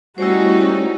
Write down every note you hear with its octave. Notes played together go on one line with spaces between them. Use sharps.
G3 A3 C#4 D#4 E4 F#4 C5